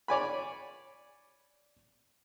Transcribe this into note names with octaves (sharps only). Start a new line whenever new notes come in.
C#5 D5 G#5 B5